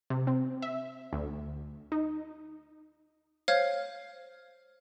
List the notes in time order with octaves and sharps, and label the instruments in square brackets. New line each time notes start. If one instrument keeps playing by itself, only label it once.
[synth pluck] C3
C4
E5
D2
D#4
[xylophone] C5 C#5 F5 F6 G#6